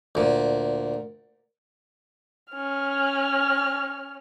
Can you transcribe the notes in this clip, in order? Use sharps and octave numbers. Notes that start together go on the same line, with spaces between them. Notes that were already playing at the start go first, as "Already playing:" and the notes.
D2 A#2
C#4 F6